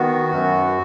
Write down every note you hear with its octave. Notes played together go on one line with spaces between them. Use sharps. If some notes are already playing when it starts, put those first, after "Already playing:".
Already playing: D#3 B3 F#4
F#2